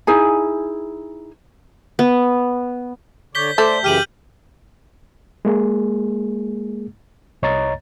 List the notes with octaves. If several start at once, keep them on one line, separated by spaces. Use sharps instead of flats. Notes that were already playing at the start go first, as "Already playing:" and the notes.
D#4 E4 G#4 G#5
B3
D3 C#5 D5 G6 B6 G7
A3 C5 D5 G6
F#2 C#3 E3 G4 F6 D#7 F#7
G#3 A#3 G#4
C2 C#5 D#5 A#5 A6